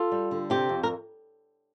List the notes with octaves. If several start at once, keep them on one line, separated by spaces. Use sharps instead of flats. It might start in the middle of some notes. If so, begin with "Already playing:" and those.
Already playing: F4 A4
G3
D3
C3 G4
F2
A#4